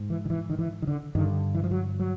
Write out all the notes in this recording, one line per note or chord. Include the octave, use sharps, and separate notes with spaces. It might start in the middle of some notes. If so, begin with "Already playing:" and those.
Already playing: G#2
E3
D#3
E3
D#3
E3
D#3
D3
G2 D3 D#3
E3
F3
F#3
F#3